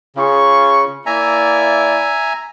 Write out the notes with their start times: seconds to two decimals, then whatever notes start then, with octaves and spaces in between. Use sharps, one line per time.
0.16 C#3 F4 G#4 C#6
1.06 A#3 E4 D5 E5 G#5 A#5